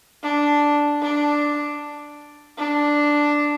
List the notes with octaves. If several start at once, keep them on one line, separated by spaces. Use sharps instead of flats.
D4
D4
D4